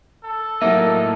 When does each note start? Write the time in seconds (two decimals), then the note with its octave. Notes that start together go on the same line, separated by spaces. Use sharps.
0.24 A4
0.62 A2 F#3 A#3 D#4 E5